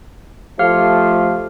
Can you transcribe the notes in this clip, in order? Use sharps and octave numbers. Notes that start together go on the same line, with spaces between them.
F3 A3 G4 F5 F6